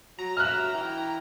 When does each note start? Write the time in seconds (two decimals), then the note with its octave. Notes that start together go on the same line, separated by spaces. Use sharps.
0.19 F#3 A#5
0.37 F#3 E5 F6 F#6
0.74 E3 G5